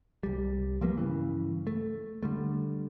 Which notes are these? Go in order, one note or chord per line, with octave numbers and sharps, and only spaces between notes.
C2 G3
F3 G3 A#3 B3
G2 C#3 E3
A3
D3 G3 A3